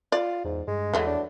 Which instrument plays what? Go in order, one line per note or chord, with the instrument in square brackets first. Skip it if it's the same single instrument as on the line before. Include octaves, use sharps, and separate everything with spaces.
[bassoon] F4 [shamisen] D5
[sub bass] E2 [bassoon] G#2
[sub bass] G2 [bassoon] G#3
[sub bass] E2 [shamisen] E3 F#3 A3
[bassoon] D4